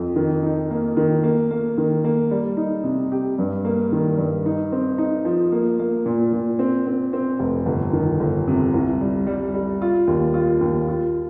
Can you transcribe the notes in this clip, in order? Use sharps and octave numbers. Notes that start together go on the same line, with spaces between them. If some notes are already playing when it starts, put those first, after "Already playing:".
Already playing: F2
D#3
D#4
A#3
D#3
A#3
A#3
D#3
A#3
G3
D#4
C3
G4
G2
A#3
D#3
G2
D#4
C4
D#4
F3
A#3
A#3
A#2
A#2
C4
C4
C4
F1
G1
D#3
G1
C3
C2
G3
G3
G3
F4
D#2
F4
D#2
F4